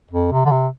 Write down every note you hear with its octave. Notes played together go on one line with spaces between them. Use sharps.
F2
C3
D3
C3